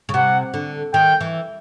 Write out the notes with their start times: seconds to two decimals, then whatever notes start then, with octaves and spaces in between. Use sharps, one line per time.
0.09 C#3
0.14 C3 F#5
0.54 D3
0.94 D#3 G5
1.21 E3